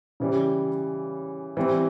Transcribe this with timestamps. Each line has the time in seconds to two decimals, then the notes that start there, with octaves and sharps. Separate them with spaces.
0.20 C#3 E3 G3
1.57 E3 G3 C4